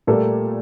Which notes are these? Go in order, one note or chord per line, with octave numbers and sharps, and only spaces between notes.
A#2 G3 A3 A#3 A4